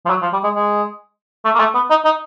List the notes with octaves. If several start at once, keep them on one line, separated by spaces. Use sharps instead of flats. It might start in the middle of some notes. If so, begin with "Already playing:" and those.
F3
F#3
F3
G3
G#3
G#3
A3
A#3
A3
B3
D#4
D#4